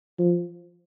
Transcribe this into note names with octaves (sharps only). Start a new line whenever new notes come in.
F3